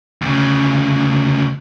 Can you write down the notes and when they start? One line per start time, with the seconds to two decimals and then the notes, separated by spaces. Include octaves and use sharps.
0.22 D2 C#3